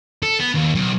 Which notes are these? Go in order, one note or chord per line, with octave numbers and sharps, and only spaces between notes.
A4
B3
D#2
B1